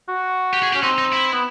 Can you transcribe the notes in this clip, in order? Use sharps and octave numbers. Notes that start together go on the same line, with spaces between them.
F#4
G4
G#4
C#4 G4
C4 D#4
D#4
E4
B3